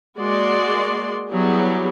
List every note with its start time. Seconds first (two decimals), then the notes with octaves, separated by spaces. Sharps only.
0.18 G#3 A#3 F#4 D5 C6
1.29 F#3 G3 B3 E4 G4 G#4